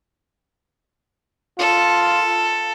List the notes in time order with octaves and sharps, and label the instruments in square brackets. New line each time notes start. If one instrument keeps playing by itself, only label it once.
[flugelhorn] F4 [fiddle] A4